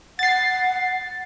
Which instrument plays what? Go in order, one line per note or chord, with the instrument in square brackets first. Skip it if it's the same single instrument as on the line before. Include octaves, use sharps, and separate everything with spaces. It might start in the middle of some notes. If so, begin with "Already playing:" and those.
[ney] F#5 [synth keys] A6 C7